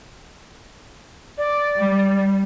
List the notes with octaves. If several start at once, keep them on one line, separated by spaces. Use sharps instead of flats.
D5
G3